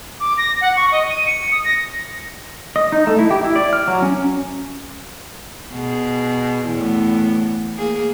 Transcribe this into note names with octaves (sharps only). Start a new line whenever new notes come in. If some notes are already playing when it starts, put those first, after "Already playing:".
D6
A#6
F#5
C#6
D#5
D#7
C#7
D#6
A#6
D#5
D#4
A3
E4
G4
E4
D5
F6
F#3
C#4
B2 G#4
E2 A2 B3
A#3 G#4